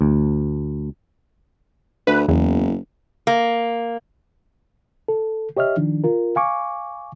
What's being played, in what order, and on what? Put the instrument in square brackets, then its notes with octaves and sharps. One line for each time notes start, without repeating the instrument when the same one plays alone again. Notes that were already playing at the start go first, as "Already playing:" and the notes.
[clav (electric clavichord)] D2
[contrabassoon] D2 [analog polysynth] B4
[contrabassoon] F#1 [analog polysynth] E2
[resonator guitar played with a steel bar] A#3
[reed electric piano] A4
G4 C#5 D#5 E5 F6
D#3 F3 D4
F4 A#4
F5 G#5 C#6 D6